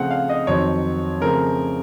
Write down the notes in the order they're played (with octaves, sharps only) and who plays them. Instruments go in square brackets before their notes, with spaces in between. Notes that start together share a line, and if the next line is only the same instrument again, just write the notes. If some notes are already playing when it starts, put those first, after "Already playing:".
Already playing: [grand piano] C#3 F3 A3 C4 F5 F#5
F5
D#5
F2 D#3 F#3 C4 C#5
C#3 F3 A3 C4 A#4